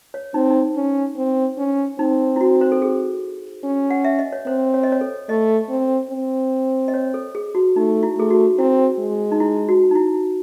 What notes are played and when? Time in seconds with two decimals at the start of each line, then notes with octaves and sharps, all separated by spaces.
0.14 C#5
0.34 C4 D#4
0.50 D#4
0.76 C#4
1.17 C4
1.58 C#4
1.99 C4 D#4
2.36 E4
2.41 F#4
2.61 C5
2.72 A4
2.82 G#4
3.64 C#4
3.90 F#5
4.05 E5
4.19 D#5
4.32 C#5
4.46 C4 C5
4.74 C#5
4.83 D#5
4.92 C#5
5.01 A4
5.29 A3 D#5
5.69 C4
6.11 C4
6.88 D#5
6.94 C#5
7.14 A4
7.35 G#4
7.55 F#4
7.76 A3 D#4
8.03 E4
8.17 A3 G#4
8.30 F#4
8.58 C4 E4
8.99 G#3
9.32 D#4
9.40 E4
9.69 F#4
9.91 D#4
9.95 E4